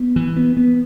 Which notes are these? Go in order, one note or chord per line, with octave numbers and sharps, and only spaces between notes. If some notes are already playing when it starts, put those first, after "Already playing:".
Already playing: B3
E3
B3
B3